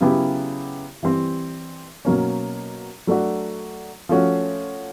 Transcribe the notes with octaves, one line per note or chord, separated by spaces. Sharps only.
C#3 F#3 B3 E4 G4
E3 G3 C4
B2 F#3 A#3 C#4
F#3 A3 D4 F#4
F3 A3 C#4 F#4